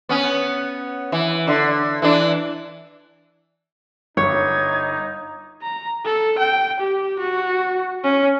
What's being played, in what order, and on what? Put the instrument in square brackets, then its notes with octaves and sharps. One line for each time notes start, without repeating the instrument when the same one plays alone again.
[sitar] B3 C#4
E3
D3
E3 D4
[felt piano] G1 [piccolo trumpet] D#4 [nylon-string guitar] C#5 [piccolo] G#6
[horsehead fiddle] A#5
A4
G5
G4
F#4
C#4